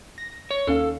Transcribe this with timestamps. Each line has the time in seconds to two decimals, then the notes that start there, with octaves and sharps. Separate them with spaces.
0.18 A#6
0.51 C#5
0.67 D#2 C#4 A4 F5